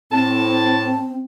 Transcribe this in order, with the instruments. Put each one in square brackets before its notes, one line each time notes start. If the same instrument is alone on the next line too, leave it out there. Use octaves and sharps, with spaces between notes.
[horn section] A2 A5 [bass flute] C4